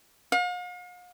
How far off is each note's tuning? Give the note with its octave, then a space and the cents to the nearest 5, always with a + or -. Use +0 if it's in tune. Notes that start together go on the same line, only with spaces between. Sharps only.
F5 +45